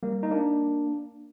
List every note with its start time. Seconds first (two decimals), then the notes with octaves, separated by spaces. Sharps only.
0.03 G3 A#3
0.23 D#4
0.31 A#3 D4